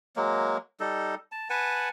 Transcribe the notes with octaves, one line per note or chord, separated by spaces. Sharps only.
F#3 G#3 A#3
G3 D#4 A4
A5
B4 F#5 G#5 A5